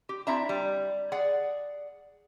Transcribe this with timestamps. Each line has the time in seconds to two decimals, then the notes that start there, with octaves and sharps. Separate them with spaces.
0.09 G4
0.27 C4 D4 E4 E5 A5 A#5
0.49 G3
1.12 G#4 D5 F#5